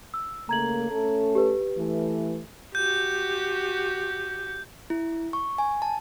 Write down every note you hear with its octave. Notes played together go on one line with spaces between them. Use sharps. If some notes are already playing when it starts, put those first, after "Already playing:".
E6
C#3 A3 A#3 A#5 G#6 F#7
A3 C#4 A4
G4 B4
E3 A3
F#4 G4 G6
E4
C#6
G#5
A5